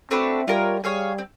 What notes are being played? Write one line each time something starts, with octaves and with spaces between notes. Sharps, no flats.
A3 C4 D4 F#4 B4
G3 F4 A#4 C#5
G3 G#4 C#5 F5 G#5
C4